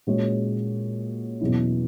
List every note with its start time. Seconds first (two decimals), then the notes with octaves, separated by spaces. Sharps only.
0.07 A#2 G#3 C#4 F#4 C#5
1.41 E2 B2 F#3 C#4 E4